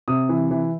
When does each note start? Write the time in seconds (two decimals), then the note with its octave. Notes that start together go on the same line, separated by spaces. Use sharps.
0.08 C3 D#6
0.29 E3
0.51 E3